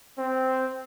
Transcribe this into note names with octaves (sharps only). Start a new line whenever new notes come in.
C4